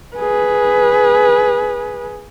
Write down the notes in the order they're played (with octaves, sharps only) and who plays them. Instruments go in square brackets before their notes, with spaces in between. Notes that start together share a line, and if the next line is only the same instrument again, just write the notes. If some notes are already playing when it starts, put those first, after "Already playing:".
[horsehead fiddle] G#4 B4